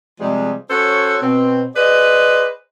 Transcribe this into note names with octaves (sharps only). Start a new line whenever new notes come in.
C3 F3 G3 G#3
C#4 F#4 A4 C5 C#5
B2 C4
G#4 B4 C5 D5 D#5